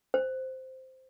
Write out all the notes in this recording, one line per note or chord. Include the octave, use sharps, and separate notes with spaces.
C5